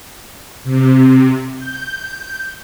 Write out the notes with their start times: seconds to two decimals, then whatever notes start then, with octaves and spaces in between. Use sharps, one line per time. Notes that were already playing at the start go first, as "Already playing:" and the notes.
0.64 C3
1.57 G6